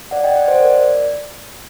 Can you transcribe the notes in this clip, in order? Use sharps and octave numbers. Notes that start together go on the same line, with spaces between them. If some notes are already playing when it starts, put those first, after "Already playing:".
D5 F#5
D#5 G5
D5 F#5
C5 D#5
A#4 D5